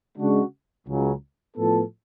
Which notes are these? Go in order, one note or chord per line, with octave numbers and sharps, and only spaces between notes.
C#3 G#3 D4 F#4
C#2 C#3 F#3
A2 F3 B3 F4 A4